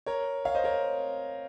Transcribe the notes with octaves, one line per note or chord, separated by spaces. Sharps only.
A#4 C#5
C#5 F5
C5 D#5
A#4 C#5